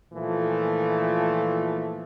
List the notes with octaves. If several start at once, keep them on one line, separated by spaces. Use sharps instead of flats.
A#2 E3 F3 A3